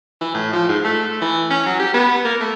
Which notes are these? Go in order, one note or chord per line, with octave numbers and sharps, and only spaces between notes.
E3
A2
F3
G#2
A3
E3
C#4
F#3
G4
B3
A#3
A3